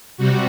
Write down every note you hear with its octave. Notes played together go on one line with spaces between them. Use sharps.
C3 G3 F#4